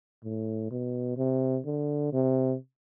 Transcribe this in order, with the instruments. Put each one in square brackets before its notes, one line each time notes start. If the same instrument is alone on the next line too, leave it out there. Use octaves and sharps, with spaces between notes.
[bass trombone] A2
B2
C3
D3
C3